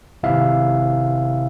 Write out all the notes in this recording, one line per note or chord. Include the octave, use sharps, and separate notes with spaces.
G#1 C3 E4 E5 F5